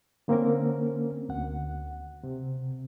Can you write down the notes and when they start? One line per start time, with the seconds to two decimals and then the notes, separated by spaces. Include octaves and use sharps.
0.28 D3 A#3 C4 C#4 A#4
1.29 D2 F#5
2.23 C3